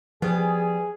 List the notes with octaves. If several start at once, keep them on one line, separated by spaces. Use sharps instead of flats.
F3 G3 B3 G#4